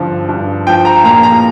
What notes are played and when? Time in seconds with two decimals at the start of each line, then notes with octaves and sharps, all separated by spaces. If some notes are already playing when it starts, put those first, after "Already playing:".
Already playing: G2 D3 F3
0.29 G2
0.67 F3 G5
0.85 A#5
1.04 A#2 A#5
1.23 A#5